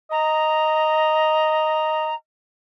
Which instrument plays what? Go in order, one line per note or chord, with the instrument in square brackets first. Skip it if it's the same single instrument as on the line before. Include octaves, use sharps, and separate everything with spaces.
[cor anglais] D#5 [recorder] A#5